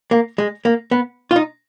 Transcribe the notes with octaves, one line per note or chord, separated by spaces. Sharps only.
A#3
G#3
A#3
B3
F4
D#4